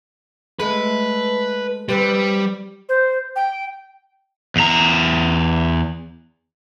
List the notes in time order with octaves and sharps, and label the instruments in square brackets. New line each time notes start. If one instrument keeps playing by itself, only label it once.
[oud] G#3 A3 [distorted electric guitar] B4
[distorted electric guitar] G3 [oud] C4 B4 C5
[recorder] C5
G5
[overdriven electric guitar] E2 A#5